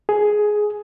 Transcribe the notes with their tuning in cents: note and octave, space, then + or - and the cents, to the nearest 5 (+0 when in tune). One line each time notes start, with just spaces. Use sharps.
G#4 +10